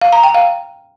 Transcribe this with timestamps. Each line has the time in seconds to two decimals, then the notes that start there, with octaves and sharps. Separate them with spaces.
0.02 F5
0.12 A#5
0.23 G5
0.34 F5